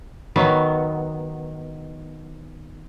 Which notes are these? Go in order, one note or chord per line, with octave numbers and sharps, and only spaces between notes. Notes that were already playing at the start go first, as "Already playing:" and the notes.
D#3 F#3 B3